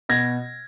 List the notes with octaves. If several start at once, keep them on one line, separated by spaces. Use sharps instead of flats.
B2 G#6 A#6